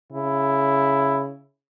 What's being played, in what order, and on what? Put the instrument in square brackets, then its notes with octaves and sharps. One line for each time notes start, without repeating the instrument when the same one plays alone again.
[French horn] C#3 [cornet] E4